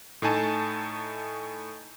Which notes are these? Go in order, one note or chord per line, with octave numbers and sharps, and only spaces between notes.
A2 A3 D#4 G#5 A5